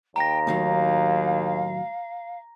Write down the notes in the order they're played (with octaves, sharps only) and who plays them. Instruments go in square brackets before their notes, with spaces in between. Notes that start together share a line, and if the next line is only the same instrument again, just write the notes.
[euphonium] D#2 [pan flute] G5 [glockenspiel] A#5 A#6
[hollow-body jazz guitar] A2 D#3 F#3 [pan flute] F5